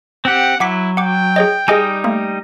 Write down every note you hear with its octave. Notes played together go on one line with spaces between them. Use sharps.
C4 G4 F#5
F#3 E4 F#5 D6 B6
F#5 G5 D6
G#4 C#5 D#5
G3 D#4 G#4 D#5 G#5 D#6
A3 A#3